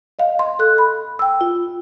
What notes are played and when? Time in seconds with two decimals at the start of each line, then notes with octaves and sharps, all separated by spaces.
0.19 D#5 F5
0.39 C6
0.59 A4 F#6
0.78 B5
1.19 G5 E6
1.41 F4